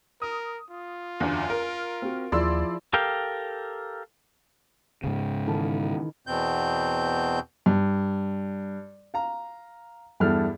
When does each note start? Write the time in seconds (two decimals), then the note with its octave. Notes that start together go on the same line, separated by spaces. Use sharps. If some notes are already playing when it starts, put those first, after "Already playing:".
0.22 A#4 D#6
0.70 F4
1.20 F#1 E2 D3
1.50 A#4
2.02 C4 F#4
2.32 D#2 F3 E4 G#4 D5 C6 E6
2.93 G4 A4 A#4 F5 G5
5.04 G#2 C#3
5.47 D#3 E3 A4
6.27 E2 B2 C4 G6
7.66 G2
9.14 F5 A#5
10.20 E2 G2 A4 F6